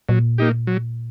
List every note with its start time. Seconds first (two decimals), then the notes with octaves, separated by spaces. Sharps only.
0.09 A#2 F#3
0.38 A#3 D#4 G4
0.67 F#3